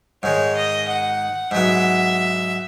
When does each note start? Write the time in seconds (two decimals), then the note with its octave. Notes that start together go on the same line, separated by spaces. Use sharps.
0.23 G#2 D#3 G#3 C#5
0.56 D#5
0.88 F#5
1.51 G#2 F#3 B3 E5